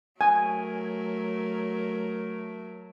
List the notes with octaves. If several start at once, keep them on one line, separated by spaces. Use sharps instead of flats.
F#3 A3 A#4 G#5